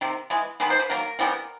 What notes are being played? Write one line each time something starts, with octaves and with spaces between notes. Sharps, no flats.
C3 D#3
E3 G#3 B3
D#3 G#3 B3 B4
C5
B4
D#3 F#3 A#3 A#4
C3 E3 G3 B3